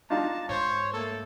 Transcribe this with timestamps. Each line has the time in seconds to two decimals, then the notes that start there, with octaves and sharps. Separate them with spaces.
0.10 D4 D#4 F4 A5 A#5
0.49 G#2 C5 C#5
0.94 A3 A#3 A4